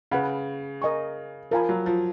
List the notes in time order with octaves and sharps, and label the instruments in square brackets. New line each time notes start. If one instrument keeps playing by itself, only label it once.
[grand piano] C#3 [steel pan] B4 F#5 B5
[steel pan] A#4 D#5 G#5 C#6
[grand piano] F3 [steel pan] A#4 F5 G#5 B5
[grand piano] F#3
F3